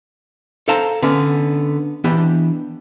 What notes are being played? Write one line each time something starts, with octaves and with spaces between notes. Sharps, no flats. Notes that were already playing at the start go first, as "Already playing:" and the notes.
A4 C5 F5 G5 A5 A#5
D3 B3 C#4 D4
E3 B3 D4 G4